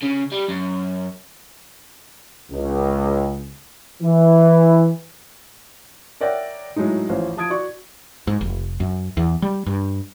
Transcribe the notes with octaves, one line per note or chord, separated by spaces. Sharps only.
C#3
G3
F#2
C#2
E3
A#4 C#5 D5 E5 F#5 G5
A2 F#3 G#3 A3 D#4
A1 F3 C#4 C5
F3 A5 D#6 G#6 D7
F#4 D5 C#6
G#2
F1
F#2
E2
G3
G2